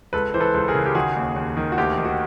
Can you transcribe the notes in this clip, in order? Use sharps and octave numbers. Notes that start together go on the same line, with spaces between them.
C#2 A4 B4
E3 C5
A4 B4
C#2
G#4 A#4
C#3
G4
D#3 F#4 G#4
D#2
D#2
D#3
F#4
D2 G4
D#3
F#4